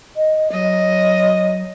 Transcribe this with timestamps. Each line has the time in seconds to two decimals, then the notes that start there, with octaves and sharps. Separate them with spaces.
0.16 D#5
0.52 F#3 D#5